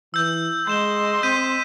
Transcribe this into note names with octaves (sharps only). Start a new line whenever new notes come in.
E3 E6 G6
G#3 D#5 C6 G6 E7 G7
C4 G6 B6 D#7